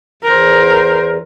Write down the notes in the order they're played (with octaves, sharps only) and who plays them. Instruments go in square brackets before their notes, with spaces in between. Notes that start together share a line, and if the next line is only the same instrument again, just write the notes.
[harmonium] E2 [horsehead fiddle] A#4 C5